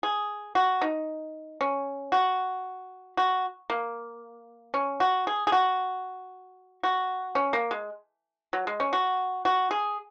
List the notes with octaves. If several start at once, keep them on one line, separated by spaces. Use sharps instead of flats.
G#4
F#4
D#4
C#4
F#4
F#4
A#3
C#4
F#4
G#4
G#4
F#4
F#4
C#4
A#3
G#3
F#3
G#3
C#4
F#4
F#4
G#4